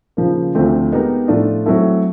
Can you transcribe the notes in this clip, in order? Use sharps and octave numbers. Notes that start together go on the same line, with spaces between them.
C#3 F3 A#3
D2 D3 F3 A3 C4
G#3 B3 D#4 G4 A#4
A2 F3 A3 D4 F4
F#3 A3 C4 E4 A4